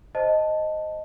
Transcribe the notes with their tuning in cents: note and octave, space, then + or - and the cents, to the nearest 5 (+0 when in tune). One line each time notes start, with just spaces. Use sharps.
C5 +0 D#5 +0 A5 +0